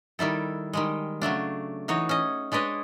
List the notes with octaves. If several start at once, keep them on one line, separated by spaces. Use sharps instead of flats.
D#3 G3 E4 A4
D#3 G3 G#3
C#3 F#3 A3 D4
E3 D#4 F#4 C#5
C#4 D#5
G#3 D4 B4 C#5 D#5